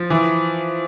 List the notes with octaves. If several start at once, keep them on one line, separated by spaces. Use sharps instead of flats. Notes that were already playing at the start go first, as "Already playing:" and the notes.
Already playing: F3
E3